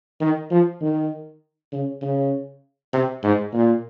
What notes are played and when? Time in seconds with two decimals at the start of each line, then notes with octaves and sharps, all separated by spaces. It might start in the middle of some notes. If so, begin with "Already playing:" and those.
0.21 D#3
0.51 F3
0.81 D#3
1.72 C#3
2.02 C#3
2.93 C3
3.23 G#2
3.53 A#2